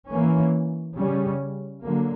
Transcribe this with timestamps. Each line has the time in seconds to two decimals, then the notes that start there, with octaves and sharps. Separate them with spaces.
0.11 E3 A#3 C#4
0.98 C#3 G3 C#4
1.84 D3 F#3 A#3